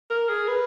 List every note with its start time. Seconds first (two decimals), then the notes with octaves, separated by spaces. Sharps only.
0.10 A#4
0.29 G#4
0.48 B4